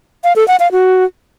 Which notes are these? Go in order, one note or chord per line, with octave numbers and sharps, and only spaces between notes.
F5
A4
F#5
F5
F#4